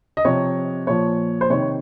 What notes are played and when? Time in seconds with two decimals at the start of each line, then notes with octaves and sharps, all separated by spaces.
0.17 D#5
0.25 C3 F3 C#5
0.87 A#2 F3 C#5
1.41 C5
1.50 C3 D#3 C#5